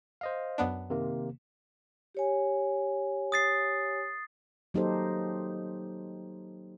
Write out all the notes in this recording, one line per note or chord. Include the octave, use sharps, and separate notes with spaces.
C5 D#5 F5
F#2 B3 D4
C3 D#3 A#3
G4 C#5 G#5
D#6 A6 C7
F#3 A#3 D#4 G4 A4 C5